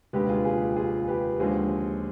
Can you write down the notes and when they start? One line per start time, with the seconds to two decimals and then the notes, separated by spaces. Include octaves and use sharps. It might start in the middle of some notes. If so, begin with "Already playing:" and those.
0.13 F1 D#2 D3 G#3 G4 B4
0.29 F4 G#4
0.45 F4 G#4
0.61 G4
0.76 F4 G#4
1.07 G4 B4
1.39 D#2 D3 F3 G#3 G#4 C5